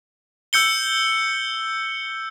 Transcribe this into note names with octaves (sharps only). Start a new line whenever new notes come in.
E6 G6 C#7 G7